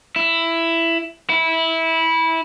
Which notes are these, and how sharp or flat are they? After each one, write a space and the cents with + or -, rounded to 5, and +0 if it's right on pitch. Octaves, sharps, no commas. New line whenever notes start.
E4 +10
E4 -15